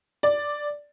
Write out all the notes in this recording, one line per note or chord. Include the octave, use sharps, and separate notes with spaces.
D5